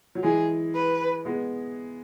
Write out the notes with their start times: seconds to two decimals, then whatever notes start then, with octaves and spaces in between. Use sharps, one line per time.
0.15 F#3
0.23 E3 G#3 G#4
0.74 B4
1.25 G#3 B3